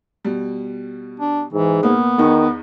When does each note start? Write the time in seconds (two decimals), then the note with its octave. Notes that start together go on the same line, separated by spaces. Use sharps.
0.25 B2 G3
1.20 D4
1.53 G#2 E3
1.83 A#2 A#3 B3
2.18 E2 D#3 D#4 C#6